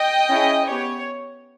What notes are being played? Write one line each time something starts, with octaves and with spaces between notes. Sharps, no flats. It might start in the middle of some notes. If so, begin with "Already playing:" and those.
Already playing: D#5 G5
C#4 E4 G#4
B3 G4 C#5